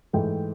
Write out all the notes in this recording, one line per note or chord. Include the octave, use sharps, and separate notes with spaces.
G#2 E3 A3 G5